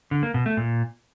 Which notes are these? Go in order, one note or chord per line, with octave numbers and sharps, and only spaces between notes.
D3
A#3
B2
A3
A#2